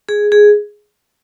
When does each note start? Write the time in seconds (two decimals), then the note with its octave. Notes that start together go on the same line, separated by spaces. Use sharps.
0.09 G#4
0.32 G#4